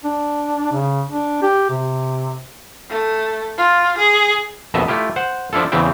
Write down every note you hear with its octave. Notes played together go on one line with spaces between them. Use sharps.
D4
C#3
D4
G4
C3
A3
F4
G#4
A#1 F2 B2 D#5 E5 A5
A3 E4 F4 G4
C5 F#5
F3 D4 E4 F4 A4
E2 C#3 E3 C4 E5 G5